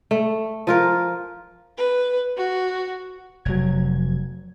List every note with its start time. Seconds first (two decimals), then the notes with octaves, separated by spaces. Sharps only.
0.11 A3
0.67 F3 F4 A#4
1.77 B4
2.37 F#4
3.45 F1 F#3 G#6